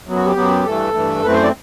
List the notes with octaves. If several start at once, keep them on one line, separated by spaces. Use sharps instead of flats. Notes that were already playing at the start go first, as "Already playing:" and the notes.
F#2 F#3 B3
F#4
G4
F#2 F#3 B3
G2 E3 A3 A4
G2 E3 A3
F#2 E3 A3 C4 B4
C5
D5